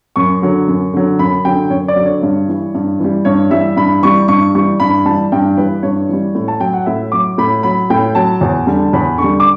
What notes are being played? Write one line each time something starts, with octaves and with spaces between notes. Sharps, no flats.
F#2 C#6
D3 F#3
F#2
D3 F#3
F#2 B5
D3 F#3 G5
F#2 C#5
D5
D3 F#3
C#5
G2
E3 G3
G2
E3 G3
G2 C#5
E3 G3 E5
G2 B5
E3 G3 C#6
G2 C#6
E3 G3 C#6
G2 B5
E3 G3 A5
G2 G5
E3 G3 B4
G2 C#5
E3 G3
A2
A5
F#3 G5
F#5
A2 E5
F#3 D6
A2 B5
F#3 B5
A2 G5
F#3 A5
E2
D3 G3
E2 B5
D3 C#6
G3
D6